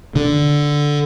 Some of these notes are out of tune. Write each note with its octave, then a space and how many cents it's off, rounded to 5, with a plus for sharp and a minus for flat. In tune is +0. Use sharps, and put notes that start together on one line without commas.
D3 -5